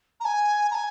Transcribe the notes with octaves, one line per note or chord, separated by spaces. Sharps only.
A#5
G#5
A#5
G#5